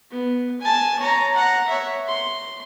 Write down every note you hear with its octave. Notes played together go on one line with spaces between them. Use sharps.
B3
G#5 A5
C#5 A#5
F#5 A#5
C#5 E5
C6